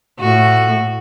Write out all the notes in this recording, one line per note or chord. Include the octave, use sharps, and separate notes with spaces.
A2 F#4